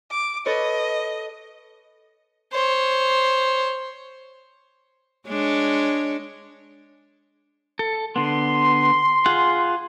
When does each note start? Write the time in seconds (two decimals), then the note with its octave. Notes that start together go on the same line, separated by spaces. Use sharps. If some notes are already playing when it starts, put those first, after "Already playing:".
0.11 D6
0.46 A4 B4 C#5 D#5
2.52 C5 C#5
5.28 G#3 D4 C#5
7.79 A4
8.16 D3 B3 C6
9.26 F4 G#4 F#5